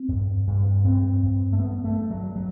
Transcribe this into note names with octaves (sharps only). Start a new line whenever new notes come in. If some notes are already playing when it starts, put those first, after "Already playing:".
Already playing: C4
G2
G2
G2 C4
G2
A3
G2 B3
A3
G2
F#3
F#3